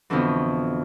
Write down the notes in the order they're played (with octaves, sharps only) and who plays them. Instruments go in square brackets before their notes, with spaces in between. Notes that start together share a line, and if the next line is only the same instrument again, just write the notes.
[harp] F2 B2 D3 E3